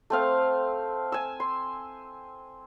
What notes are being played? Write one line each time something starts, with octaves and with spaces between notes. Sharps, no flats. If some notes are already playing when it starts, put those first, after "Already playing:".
A3 C4 F5
G#5 E6
C6